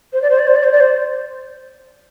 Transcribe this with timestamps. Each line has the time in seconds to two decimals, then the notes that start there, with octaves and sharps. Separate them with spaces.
0.13 C5
0.22 D5
0.30 C5
0.39 D5
0.47 C5
0.56 D5
0.63 C5
0.72 D5
0.80 C5